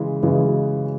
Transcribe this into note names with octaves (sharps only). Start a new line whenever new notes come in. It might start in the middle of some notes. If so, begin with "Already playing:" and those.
Already playing: C#3 E3 G#3
C#3 E3 G#3